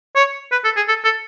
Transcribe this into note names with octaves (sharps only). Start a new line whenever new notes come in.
C#5
B4
A4
G#4
A4
A4